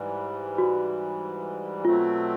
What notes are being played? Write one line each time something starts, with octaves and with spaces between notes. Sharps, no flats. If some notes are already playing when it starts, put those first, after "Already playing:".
Already playing: G#2 E3 G3
F#4
B2 F#3 A3 C4 F4